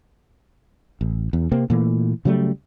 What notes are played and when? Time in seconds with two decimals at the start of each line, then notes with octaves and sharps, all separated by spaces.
1.01 A1
1.33 E2
1.52 C3 A#3 C4
1.70 A#2 E3 A3
2.25 C#3 F#3 G3 A3